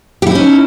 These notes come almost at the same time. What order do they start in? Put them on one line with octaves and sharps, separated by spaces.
G4 E4 D#4 C#4